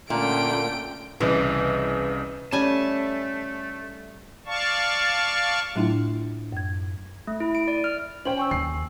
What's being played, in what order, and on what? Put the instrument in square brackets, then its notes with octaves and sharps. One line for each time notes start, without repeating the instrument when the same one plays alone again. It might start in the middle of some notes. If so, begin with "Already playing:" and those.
[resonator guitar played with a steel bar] A#2 [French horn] D3 [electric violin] A3 C#4 [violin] G5 D7
[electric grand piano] C2 C#3 D#5 [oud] E3
[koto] G3 G#5 [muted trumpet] A3 [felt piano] C#4 [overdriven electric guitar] A5
[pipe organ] D5 F5 A5 C#6
[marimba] A2 F#3 A3 D4 E4 F4
F#2 G#6
[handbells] A3
E4
D7
D5
F6
[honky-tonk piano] C#4 C5 G5 [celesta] F#7
[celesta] G#5 C#6 E6
[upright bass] D#2 [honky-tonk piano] C7